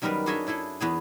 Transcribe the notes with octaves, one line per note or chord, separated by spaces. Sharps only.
F#2 D#3 G3 B3 A#4 B4
D4 F#4 G#4 C#5 D#5 E5
D4 E4 G#4 A4
E2 B3 G#4